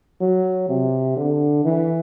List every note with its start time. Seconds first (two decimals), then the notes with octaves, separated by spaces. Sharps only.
0.20 F#3
0.69 C3
1.16 D3
1.65 E3